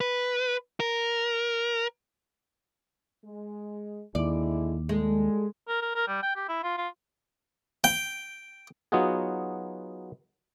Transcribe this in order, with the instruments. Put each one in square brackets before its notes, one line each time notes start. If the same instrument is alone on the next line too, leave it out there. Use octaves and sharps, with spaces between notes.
[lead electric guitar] B4
A#4
[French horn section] G#3
[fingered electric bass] D#2 [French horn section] D3 G#3 E4 [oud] D5
[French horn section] G3 A4 [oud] G#3
[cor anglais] A#4
A#4
A#4
G3
G5
G4
E4
F4
F4
[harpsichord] G5
[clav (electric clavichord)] F#3 B3 D#4 F4 F#4 G#4